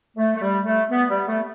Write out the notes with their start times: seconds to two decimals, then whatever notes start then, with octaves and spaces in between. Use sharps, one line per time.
0.17 A3
0.36 A3
0.42 G3
0.66 A3
0.91 B3
1.09 G3
1.27 A3